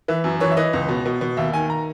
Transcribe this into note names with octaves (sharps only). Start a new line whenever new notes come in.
E3 E5
F#2
E3 C#5
E5
E3 D#5
C#2
B2
B2
B2
D#2 E5
D#3 G#5
A#5